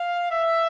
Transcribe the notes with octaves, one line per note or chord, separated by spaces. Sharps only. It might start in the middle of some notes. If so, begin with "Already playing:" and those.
Already playing: F5
E5